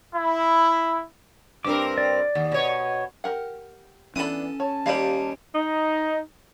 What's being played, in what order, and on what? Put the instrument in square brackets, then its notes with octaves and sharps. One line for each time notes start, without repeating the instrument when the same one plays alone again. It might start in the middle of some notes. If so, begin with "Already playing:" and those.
[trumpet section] E4
[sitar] G2 C4 A#4 [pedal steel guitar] D6
[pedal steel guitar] D5
[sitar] D#2
B2 C#5
[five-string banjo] G4 A#4 F#5
[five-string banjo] E3 B3 B5 [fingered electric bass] C#4 [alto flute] D4 [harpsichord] A4 D#6
[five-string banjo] C#5 [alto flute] A5
[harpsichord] D#2 G3 [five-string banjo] F5 B5
[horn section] D#4